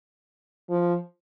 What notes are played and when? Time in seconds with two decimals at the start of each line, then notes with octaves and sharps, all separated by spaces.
0.70 F3